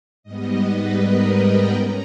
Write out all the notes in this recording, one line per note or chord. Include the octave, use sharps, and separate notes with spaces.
G#2 G3 B3 D#5
B4
A#4
G5
C#4 A#5